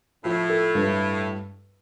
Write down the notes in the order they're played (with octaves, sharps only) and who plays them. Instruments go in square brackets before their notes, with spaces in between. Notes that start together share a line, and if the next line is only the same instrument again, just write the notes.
[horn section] A2 [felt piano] F3
[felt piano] A4
G2